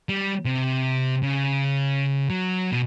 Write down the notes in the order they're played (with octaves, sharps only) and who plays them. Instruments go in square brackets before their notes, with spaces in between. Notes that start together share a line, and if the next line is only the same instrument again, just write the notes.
[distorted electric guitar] G3
C3
C#3
F#3
B2